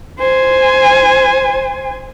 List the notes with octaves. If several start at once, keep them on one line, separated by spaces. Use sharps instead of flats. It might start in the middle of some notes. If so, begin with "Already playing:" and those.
C5 G#5